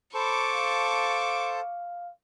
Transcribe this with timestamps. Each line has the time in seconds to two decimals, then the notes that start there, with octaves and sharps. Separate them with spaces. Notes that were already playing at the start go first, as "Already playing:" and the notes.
0.14 A4 C5 A5 B5 C#6 D6
0.53 F5